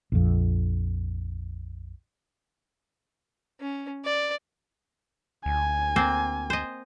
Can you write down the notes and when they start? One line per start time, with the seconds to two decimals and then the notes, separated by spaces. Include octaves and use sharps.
0.12 A#1 F2
3.61 C#4
4.05 D5
5.46 D2 G#5
5.96 A#3 C4 C5
6.50 C5 D#5